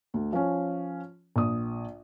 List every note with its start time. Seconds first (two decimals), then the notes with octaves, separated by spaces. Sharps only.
0.14 D2
0.33 F3 C#4
1.36 A#1 D#6